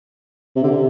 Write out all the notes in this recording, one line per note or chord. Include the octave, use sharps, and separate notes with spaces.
C3
D3
C3